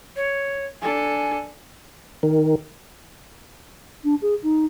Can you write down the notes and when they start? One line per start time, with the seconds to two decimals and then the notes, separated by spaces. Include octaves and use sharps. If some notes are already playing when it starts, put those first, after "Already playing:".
0.16 C#5
0.82 D4 A4 G#5
2.23 D#3
4.04 D4
4.22 G#4
4.43 D#4